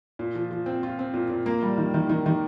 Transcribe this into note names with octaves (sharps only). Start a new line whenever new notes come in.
A#2
F3
F3
C4
F4
C4
A#2
A#2
A#3
G3
D#3
D#3
D#3
D#3